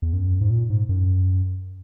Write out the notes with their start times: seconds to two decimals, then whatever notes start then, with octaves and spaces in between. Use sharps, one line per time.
0.02 E2
0.13 F#2
0.41 G#2
0.50 A#2
0.70 G#2
0.89 F#2